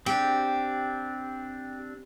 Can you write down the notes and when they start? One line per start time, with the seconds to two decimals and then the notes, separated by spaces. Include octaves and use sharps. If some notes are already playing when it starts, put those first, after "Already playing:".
0.06 C4 D4 G4